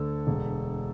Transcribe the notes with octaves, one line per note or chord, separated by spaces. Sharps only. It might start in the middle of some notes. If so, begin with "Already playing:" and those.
Already playing: D2 D3 A4
E1